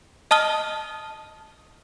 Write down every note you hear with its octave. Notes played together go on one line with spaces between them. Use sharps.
D#5 A5 D#6 F6 G7